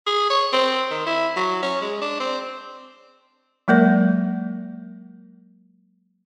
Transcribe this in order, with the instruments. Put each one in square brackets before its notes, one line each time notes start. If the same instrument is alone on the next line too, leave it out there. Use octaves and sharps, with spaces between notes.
[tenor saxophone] G#4
C#5
C4
D#3
E4
F#3
C#4
G#3
D4
C4
[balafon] F#3 G#3 A#3 A#4 D5